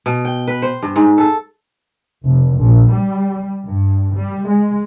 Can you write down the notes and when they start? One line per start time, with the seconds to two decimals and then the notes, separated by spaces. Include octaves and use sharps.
0.06 B2
0.25 G5
0.48 B4
0.62 C5
0.82 G2
0.96 G#2
1.18 A4
2.26 F1
2.59 A#1
2.91 G3
3.64 G2
4.16 G3
4.47 G#3